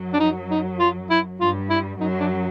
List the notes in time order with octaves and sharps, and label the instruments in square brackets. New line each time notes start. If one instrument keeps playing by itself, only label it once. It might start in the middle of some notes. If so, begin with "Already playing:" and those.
Already playing: [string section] F#2 F#3
[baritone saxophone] D4
D#4
D#4
F4
E4
[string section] G2 G3 [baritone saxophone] F4
[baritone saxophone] E4
[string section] F#2 F#3 [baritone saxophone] D#4
[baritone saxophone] D4